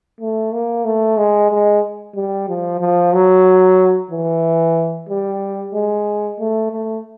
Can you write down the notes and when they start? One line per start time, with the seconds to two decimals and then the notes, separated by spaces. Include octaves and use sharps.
0.21 A3
0.53 A#3
0.85 A3
1.17 G#3
1.50 G#3
2.15 G3
2.48 F3
2.81 F3
3.13 F#3
4.11 E3
5.09 G3
5.74 G#3
6.40 A3
6.71 A3